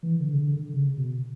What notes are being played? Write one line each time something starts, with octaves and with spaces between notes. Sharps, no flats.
E3
D3
C#3
D3
D3
C#3
B2